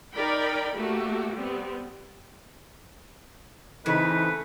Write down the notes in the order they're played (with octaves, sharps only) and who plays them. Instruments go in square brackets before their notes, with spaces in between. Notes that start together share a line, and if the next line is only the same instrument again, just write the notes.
[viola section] D#4 A#4 D5 G5 B5
A3 A#3 F#4 G4
G3 B3 C4
[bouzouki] C#3 A3 [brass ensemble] E3 C4 D#4 [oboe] B4